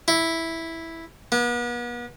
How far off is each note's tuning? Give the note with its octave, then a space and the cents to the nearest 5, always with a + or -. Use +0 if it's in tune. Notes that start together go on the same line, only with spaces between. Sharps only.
E4 -5
B3 -40